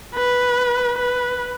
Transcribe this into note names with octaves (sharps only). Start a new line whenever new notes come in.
B4
B4